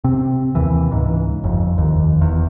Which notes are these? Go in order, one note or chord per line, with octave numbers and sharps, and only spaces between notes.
C3 C4
D#2 E3
C#2 G#2
G1 F2
F1 D#2
E2